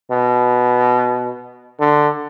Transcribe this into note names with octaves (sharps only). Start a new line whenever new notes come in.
B2
D3